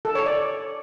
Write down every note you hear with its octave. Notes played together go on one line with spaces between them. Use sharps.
A4
C#5
D5